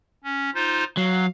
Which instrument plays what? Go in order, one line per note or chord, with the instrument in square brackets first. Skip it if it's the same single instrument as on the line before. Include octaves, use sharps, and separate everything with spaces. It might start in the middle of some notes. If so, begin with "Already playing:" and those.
[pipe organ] C#4
D#4 F4 C5
[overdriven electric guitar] F#3 [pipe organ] F5